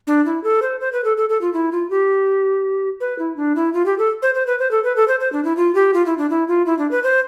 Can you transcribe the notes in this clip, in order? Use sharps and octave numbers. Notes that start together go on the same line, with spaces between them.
D4
E4
A4
C5
C5
B4
A4
A4
A4
F4
E4
F4
G4
B4
E4
D4
E4
F4
G4
A4
C5
C5
B4
C5
A4
B4
A4
C5
C5
D4
E4
F4
G4
F4
E4
D4
E4
F4
E4
D4
B4
C5